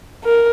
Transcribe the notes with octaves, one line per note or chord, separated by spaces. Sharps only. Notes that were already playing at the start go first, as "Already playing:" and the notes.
A#4